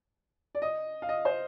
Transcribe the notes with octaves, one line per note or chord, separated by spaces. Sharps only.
D5
D#5
F5
D#5
C5